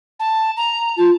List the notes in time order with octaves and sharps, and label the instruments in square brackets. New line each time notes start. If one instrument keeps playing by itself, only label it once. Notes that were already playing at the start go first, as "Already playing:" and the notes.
[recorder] A5
A#5
[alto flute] F4 [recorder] A5